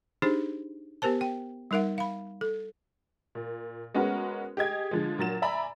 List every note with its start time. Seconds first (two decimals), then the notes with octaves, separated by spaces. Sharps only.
0.22 D4 D#4 G4 G#4 C5
1.02 B3 G4 A#4 C5 A5
1.21 G5
1.71 G3 D#4 A#4 E5 F#5
1.98 F5 B5
2.41 A4
3.35 A#2
3.94 G#3 B3 C#4 F#4 A#4 B4
4.57 G4 G#4 D#5 G#6
4.91 D3 F3 G#3
5.18 A#2 F#3 A6 E7
5.42 D5 E5 G#5 A#5 B5